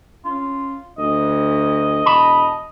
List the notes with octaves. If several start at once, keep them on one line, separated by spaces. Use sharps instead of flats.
C#4 F4
D2 D#5
E1 A5 B5